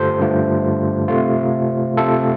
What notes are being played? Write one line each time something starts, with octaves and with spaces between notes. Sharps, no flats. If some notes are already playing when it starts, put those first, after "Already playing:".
Already playing: G2 D3 A3 F4 G4 A4 C5
G2 D3 A3 F4
C3 A3 F4
C3 A3 F4 A4